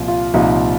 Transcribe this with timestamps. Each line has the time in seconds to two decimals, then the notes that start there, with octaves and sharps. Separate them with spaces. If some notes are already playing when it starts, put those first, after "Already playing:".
Already playing: C2 A#2 F3
0.08 F4
0.34 C2 A#2 F3 D#4